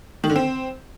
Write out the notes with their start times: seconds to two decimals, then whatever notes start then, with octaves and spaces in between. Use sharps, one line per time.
0.24 D#3
0.30 D3
0.36 C4